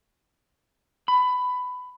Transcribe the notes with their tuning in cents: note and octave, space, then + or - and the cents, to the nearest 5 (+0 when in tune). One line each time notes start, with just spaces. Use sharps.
B5 +15